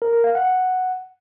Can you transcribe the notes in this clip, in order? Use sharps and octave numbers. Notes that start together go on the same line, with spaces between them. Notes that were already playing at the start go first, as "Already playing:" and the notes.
A#4
A#4
F5
F#5